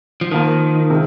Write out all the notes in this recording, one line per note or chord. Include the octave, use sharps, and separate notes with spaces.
F3
D#3 F3 A#3 F4 A#4
C3 G#3